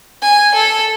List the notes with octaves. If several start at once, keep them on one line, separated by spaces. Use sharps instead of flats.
G#5
A4